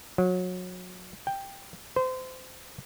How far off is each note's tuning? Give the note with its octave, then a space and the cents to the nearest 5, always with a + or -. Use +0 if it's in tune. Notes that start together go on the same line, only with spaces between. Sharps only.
F#3 -25
G5 +5
C5 -30